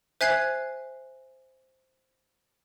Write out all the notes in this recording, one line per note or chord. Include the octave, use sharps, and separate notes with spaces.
C5 E5 G#5 F#6 G#6 C7